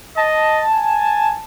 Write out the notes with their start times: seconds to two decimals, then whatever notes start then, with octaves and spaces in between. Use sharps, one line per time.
0.17 D#5 A5
0.74 G#5